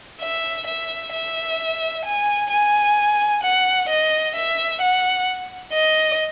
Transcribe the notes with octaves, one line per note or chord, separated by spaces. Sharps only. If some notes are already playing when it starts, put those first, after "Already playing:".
E5
E5
E5
G#5
G#5
F#5
D#5
E5
F#5
D#5